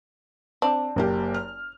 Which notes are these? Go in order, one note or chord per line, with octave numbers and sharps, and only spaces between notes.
C4 D4
F#1 A#3 G4
F6